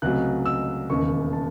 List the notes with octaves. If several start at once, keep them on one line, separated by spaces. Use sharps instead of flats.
C#2 C3 F#3 A3 F#6
E6
E1 D#2 C#3 C#6
A5